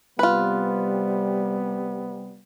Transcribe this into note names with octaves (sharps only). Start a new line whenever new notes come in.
C3 G3 B3 F4 B4